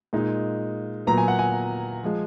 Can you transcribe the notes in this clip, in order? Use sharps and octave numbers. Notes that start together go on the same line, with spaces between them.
A#2 G#3 D#4
A#2 F#3 B3 A#5
G#5
F#5
G#5
F3 G#3